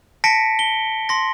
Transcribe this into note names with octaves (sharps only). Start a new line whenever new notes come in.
A5 A#6 B6 C#7 D7
G7
C6 A#6